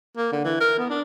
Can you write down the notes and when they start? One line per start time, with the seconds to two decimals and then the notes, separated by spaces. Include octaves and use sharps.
0.17 A#3
0.33 D3
0.45 E3
0.61 A#4
0.78 B3
0.90 D4